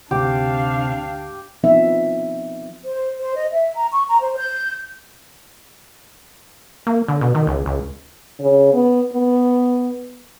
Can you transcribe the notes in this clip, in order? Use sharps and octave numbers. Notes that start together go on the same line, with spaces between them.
D2 G#2 C3 D4 G4 F5
F3 B3 C4 D#4 E5
C5
C5
D#5
E5
A#5
C#6
A#5
C5
G6
A#3
D3
B2
D#3
C#2
C#2
C#3
B3
B3